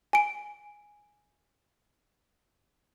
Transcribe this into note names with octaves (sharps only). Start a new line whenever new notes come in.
G#5 D7